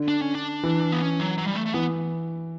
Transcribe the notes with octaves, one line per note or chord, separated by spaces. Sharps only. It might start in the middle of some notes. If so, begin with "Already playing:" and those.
Already playing: D3
D4
C#4
D4
E3
B3
C#4
F#3
F#3
G3
A3
A3
E3 B3